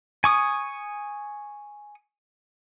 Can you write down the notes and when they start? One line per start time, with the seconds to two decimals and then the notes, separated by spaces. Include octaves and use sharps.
0.24 G#5 C#6 D#6